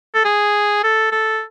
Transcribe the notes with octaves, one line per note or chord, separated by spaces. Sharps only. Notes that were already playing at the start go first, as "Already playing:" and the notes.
A4
G#4
A4
A4